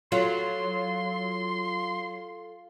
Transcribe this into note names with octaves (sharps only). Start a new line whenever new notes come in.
F#3 F4 A4 C6